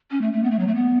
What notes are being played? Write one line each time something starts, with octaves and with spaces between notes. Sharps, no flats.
C#4
A3
A3
B3
A3
F#3
A3
B3